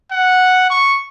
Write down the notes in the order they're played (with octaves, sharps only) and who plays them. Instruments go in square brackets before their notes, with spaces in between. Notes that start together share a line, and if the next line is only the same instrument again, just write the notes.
[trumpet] F#5
C#6